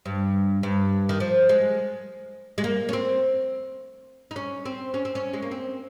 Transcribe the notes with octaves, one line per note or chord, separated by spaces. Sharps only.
G2
G2
D#3
F3
G#3
G#3
A#3
C#4
C4
D#4
C#4
C4
C#4
C4
C#4
G#3
A#3
C4